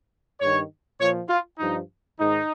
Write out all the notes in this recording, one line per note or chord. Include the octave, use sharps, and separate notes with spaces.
G2 D#3 C#5
A#2 F3 C#5
F4
G2 F3 D#4
G#2 D#3 D#4